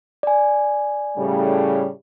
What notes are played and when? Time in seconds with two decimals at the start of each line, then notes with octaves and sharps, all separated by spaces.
0.23 D5 G#5
1.17 A2 C#3 G3